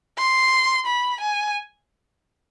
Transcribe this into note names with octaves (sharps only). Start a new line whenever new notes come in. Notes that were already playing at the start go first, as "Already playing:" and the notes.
C6
B5
G#5